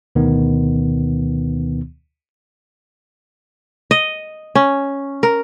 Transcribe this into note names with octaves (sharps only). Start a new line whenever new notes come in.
D2 B2 D#3 B3
D#5
C#4
A#4